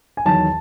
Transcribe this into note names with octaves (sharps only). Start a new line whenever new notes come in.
G#5
E2 D#3 F#3 A5